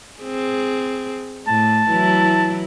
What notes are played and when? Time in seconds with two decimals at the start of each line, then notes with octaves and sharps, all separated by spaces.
0.21 C4 G#4
1.48 A2 A5
1.90 E3 F#3 E4